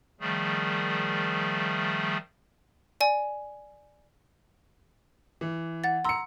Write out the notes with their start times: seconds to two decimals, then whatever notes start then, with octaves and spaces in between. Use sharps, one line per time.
0.20 D#3 F3 G3 A3 G#4
3.01 D5 G#5
5.41 E3
5.84 F#5 A6
6.05 A#5 C6 E6 C#7